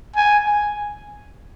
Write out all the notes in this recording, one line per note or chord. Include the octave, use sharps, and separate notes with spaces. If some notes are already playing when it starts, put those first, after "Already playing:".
G#5
G#5